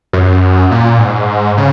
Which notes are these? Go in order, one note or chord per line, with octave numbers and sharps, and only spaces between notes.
F#2
A#2
G#2
C#3